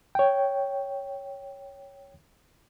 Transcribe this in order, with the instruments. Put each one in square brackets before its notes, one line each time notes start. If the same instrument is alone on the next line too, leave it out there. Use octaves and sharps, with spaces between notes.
[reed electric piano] C#5 G5